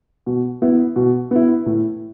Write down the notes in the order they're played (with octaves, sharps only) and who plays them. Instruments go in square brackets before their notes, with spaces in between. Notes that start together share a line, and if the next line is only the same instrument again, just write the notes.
[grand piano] B2
B3 E4
B2
B3 E4
A2